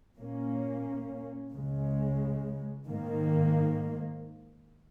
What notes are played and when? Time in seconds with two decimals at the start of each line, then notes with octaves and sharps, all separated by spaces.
0.16 A#2 A#3 C#4
1.51 C#2 C#3 G#3
2.86 G#2 D#3 A#3